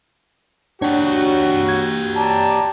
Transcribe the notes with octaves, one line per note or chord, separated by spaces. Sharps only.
D4 F#4 G4 C#5
G#6
D5 A5 A#5